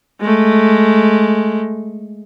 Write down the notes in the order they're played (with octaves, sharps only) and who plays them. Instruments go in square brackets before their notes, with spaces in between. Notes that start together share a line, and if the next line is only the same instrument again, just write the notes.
[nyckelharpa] G#3 A3